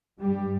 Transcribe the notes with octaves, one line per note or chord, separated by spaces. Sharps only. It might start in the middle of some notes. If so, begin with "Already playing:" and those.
G2 G3